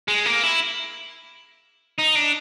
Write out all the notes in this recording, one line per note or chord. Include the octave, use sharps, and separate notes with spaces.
G#3
A#3
E4
D#4
D4